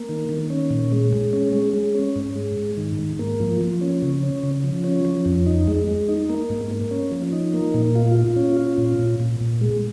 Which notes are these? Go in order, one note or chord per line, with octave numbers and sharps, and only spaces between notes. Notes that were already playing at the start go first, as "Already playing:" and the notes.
Already playing: A#3
D#3
D#3
C#4
A#2
G#3
G#3
C#4
G#3
G#3
C#4
G#2
G#3
G#2
D#3
G#2
A#3
F3
F3
C#4
C#3
C#4
C#3
F3
C#4
F3
F2
D#4
G#3
G#3
D#4
A#3
G#2
A#3
C#4
F3
D#4
A#3
A#2
F4
F4
C#4
F4
A#2
A#2
A#2
A#2
G#3